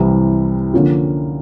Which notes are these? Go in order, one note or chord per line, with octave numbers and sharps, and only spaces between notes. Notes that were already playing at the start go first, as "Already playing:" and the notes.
Already playing: C2 C3 E3
D3 F3 A#3 C#4 F4